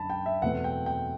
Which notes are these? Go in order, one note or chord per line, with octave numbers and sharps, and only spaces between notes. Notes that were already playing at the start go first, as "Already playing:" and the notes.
Already playing: F#2 D3 A5 B5
G5
E5
E2 B2 A3 C4 F#5
G5
G5